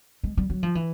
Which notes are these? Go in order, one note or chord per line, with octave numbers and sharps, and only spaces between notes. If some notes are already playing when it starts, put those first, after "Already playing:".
G#3
G3
F#3
F3
E3